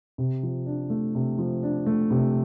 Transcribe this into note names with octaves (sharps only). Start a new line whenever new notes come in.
C3
F3
D4
A3
C3
F3
D4
A3
C3